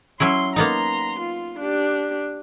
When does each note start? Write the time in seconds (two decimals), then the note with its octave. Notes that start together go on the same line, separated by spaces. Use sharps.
0.20 F#3 C#4 E4 C6
0.56 A#3 B3 D#4 A#5 C6
1.20 F4
1.60 D4 G4